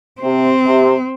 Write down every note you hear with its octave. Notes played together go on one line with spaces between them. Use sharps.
C3 C4
C3